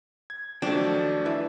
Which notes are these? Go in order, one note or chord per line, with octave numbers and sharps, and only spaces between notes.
G#6
D#2 F3 F#3 A3 D4 F#4 G5
E4 B4 E5